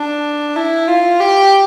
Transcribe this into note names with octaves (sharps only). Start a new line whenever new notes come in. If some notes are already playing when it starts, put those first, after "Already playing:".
Already playing: D4
E4
F4
G4